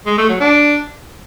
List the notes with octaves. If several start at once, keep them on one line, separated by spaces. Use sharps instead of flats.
G#3
A3
F#3
D4